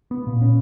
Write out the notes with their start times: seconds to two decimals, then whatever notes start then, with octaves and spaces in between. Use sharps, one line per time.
0.11 B3
0.27 A#2
0.42 C#4